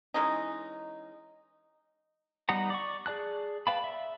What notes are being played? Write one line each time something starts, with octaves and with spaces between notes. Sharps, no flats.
E3 G#3 C#4 D#4
G3 B3 D#4 F#5 A#5
D5 C#6
G#4 D5 A5 F#6
B4 F5 G5 A5 B5
E5